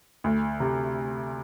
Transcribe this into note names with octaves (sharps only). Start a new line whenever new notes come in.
D2
C3